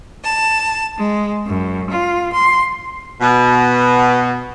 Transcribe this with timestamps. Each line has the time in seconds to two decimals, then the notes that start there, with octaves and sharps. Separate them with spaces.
0.23 A5
0.98 G#3
1.46 F#2
1.89 F4
2.31 C6
3.21 B2